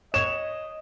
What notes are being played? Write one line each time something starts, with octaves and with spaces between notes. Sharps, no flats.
C#5 D#5 E7